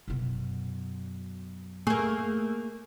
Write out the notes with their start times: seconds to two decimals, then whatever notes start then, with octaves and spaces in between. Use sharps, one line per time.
0.08 F#2 B2
1.87 A3 A#3 G#4